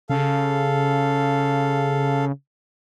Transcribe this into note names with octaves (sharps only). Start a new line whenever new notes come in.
C#3 A4 F5